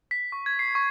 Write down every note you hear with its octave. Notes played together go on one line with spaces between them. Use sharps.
B6
C#6
G#6
C7
C#6